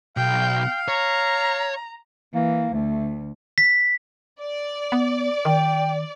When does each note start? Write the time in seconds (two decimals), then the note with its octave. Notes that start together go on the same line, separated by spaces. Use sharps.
0.17 B1 F5 G5
0.88 C#5 A#5
2.34 E3 A#3
2.73 D2 A3
3.58 B6
4.40 D5
4.92 B3
5.45 D#3 G5